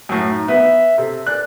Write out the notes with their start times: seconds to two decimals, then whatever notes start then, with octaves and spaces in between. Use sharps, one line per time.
0.09 F#2 A2
0.27 D#4
0.48 B3 E5
0.98 C3 A4
1.27 D5 F#6